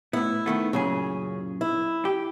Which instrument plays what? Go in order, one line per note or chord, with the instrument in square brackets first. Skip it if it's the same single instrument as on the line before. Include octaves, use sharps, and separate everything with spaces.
[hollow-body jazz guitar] A2 B3 [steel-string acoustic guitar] E4
[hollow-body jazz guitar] D#3 A3 B3
[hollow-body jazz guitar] F#2 A#2 G#4 [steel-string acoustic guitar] C#3
[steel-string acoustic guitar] E4
[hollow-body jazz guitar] G4